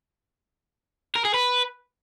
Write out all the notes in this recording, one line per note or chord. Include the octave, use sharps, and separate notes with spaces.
A#4
G#4
B4